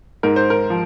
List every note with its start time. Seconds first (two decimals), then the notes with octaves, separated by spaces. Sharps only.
0.23 G#2 A#4
0.36 C5
0.50 A#4
0.70 F3